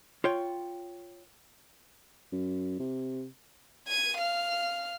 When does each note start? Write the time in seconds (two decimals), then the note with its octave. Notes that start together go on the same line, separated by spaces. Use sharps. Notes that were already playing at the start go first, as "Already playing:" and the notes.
0.24 F4 C#5 G5
2.32 F#2
2.80 C3
3.88 G#6 D#7
4.18 F5 F6